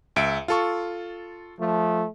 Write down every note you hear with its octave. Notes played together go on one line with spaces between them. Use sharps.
C#2 E5 D7
F4 A4 C#6
F3 A3